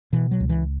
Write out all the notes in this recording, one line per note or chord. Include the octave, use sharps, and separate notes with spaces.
B2 E3
F#3
C#2
E3